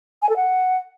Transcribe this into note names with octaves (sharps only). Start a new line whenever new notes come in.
G#5
A4
F#5